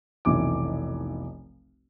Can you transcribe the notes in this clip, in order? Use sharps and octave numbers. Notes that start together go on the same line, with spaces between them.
F1 B1 E3 D6